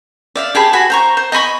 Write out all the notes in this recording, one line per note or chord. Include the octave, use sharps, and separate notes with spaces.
D5 E5 F5
G4 G#4 A5 B5
F#4 G#5 B5
C5 A#5 C#6
C5
D#5 G#5 B5 C#6